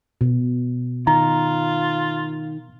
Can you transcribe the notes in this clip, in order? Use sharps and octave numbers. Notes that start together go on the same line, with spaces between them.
B2
D#3 F4 A#5